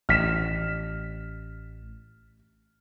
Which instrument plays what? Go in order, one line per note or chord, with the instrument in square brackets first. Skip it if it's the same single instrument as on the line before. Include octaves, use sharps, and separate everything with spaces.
[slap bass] A1 [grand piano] F6 B6 E7